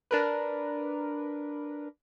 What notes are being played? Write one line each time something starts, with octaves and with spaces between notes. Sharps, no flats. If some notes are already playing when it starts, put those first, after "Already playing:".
D4 A#4 B4